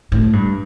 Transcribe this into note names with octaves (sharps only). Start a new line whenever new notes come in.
A2
G2